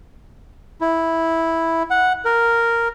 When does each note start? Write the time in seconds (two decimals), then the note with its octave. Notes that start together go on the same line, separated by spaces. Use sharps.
0.81 E4
1.90 F#5
2.25 A#4